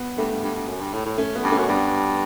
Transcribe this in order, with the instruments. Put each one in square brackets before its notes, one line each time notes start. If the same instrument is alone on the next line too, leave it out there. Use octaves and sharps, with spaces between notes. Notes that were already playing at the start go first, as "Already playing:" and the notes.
Already playing: [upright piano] B3
[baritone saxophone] G2 [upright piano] A3
[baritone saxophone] G2
G2
G2
F#2
G2
A2
A2
[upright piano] A3 C#4
B3
[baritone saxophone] G2
[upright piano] A3 C#4
[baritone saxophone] F#2
[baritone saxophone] G2 [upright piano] B3 D4